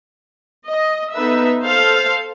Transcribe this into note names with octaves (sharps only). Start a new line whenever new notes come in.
D#5
B3 D#4 A4 B4 E5
A4 C5 F5